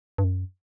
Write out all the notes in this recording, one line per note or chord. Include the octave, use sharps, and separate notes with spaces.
G2
F#2